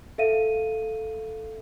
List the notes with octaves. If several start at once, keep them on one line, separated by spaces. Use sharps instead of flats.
A4 E5 F5 D#7